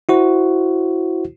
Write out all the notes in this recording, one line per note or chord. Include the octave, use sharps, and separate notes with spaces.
E4 F#4 C5